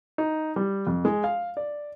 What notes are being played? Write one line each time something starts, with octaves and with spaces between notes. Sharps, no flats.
D#4
G3
F2
G#3
F5
D5